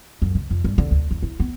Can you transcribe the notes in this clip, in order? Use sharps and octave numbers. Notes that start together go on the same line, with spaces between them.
F#2
C#3
F2
G2
D3
D2
E2
E4
B3